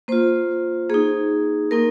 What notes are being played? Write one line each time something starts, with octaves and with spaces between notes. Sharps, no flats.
A#3 F4 C5
A#3 D#4 G#4
A#3 D#4 A#4